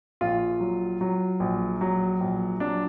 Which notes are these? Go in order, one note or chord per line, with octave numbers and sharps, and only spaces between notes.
A#1 F4
F#3
F#3
A#1
F#3
A#1
F#3 D4